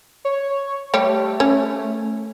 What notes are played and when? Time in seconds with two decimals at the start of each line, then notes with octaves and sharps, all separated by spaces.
0.25 C#5
0.94 G3 A3 G4 C#5
1.40 C#4